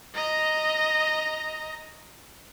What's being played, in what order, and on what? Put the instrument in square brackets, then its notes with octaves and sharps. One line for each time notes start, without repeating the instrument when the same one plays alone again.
[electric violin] D#5 A#5